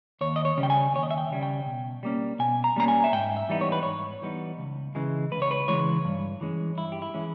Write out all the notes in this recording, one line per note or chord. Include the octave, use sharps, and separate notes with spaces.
D#2 C#5
D#5
C#5
C#3 G3 C#4
G5
G#5
D#2 C#5
D#5
E5
G5
C#3 G3 C#4
G5
B2
G3 A#3 C#4
B2 G#5
A#5
G3 A#3 C#4 A#5
G#5
E5
G#2 G5
E5
E3 G3 B3 D#4
C#5
B4
G#2 C#5
E3 G3 B3 D#4
C#2
C#3 E3 G#3
C#2 B4
C#5
B4
C#3 E3 G#3 C#5
G2
E3 G#3 C#4
G2 E4
G4
E4
E3 G#3 C#4